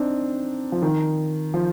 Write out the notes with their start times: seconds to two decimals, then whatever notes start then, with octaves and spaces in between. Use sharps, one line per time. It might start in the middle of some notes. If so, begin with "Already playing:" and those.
Already playing: C4 D4 D#4
0.72 F3
0.82 D#3
1.54 F3